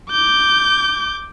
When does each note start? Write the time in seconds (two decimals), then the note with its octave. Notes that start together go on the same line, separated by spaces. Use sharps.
0.10 D6 G6